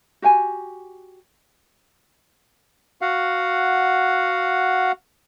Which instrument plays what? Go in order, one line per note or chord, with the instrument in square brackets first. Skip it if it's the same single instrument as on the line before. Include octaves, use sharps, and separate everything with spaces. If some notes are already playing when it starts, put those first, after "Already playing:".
[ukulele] F#4 G4 G5 G#5
[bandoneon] F#4 F5 F#5